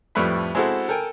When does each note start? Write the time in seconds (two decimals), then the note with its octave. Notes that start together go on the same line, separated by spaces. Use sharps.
0.15 F2 A2 G3 A3 B4 E5
0.55 G#3 C4 E4 F#4 A4
0.88 A4 A#4 G5 G#5